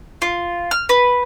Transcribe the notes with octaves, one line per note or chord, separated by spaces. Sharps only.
F4
F6
B4